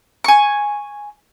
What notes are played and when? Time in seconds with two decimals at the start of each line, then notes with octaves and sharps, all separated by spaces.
0.24 G#5 C#6